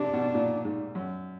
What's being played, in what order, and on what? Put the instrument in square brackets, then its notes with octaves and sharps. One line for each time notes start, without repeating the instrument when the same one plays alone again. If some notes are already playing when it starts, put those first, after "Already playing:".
Already playing: [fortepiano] C3 [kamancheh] D4
[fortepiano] B2
A#2
G#2
F#2